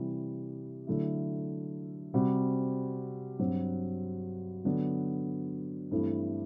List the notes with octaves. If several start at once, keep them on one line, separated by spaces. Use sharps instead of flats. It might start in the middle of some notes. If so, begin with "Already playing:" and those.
Already playing: C3 E3 G3
D3 F#3 A3 E4
C3 G3 C4 F#4
G2 F#3 C4 F#4
D3 F#3 B3 D4
G2 E3 A3 C4 E4